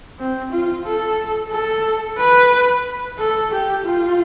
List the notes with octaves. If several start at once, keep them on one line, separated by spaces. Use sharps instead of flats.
C4
F4
A4
A4
B4
A4
G4
F4